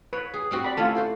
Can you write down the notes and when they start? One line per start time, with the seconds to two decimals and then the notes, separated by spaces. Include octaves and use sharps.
0.13 B4 C#5
0.34 G#4
0.51 G3 C4 F#4
0.64 D5 B5
0.77 A3 C#4 E4 F4 A4
0.95 F#4 C5 D5